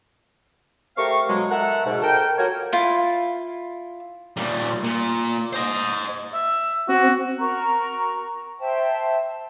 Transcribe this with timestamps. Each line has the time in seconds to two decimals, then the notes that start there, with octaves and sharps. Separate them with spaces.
0.96 A3 C4 G4 A#4 F5 C#6
1.28 B2 F#3 G#3
1.51 A4 A#4 E5 F#5
1.85 G#2 B2
2.02 A4 A#4 G5
2.37 A#3 F4 F#4 A#4 C#5
2.73 E4 F4
4.37 A#2 G3
4.83 A#2
5.53 C5 D#5
6.34 E5
6.89 C4 F#4
7.39 F#4 A#4 A#5 C#6
8.59 C5 E5 G5 A5